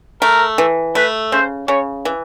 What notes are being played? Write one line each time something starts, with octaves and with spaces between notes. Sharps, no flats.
A3 A#4
E3
A3 B4
C#3 C5
C#3 C#5
E3